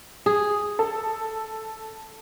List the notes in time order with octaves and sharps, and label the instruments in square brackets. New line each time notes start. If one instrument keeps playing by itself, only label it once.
[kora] G#4
[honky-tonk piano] A4